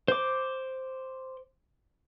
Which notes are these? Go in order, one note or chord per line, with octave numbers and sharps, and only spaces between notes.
C5 D6